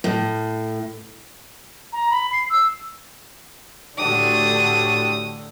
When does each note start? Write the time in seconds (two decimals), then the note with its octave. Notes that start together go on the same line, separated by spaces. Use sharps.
0.04 A2
1.93 A#5
2.11 B5
2.33 C7
2.50 E6
3.98 A2 D3 D4 F#4 G4 D#6